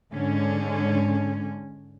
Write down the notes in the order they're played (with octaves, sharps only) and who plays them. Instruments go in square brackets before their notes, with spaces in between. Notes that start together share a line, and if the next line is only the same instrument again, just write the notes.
[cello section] G#2 D3 G#3 C#4